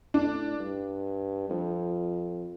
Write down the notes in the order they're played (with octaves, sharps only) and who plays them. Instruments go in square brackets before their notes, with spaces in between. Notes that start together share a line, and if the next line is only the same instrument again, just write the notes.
[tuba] A2 [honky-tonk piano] D4
[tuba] G2
F2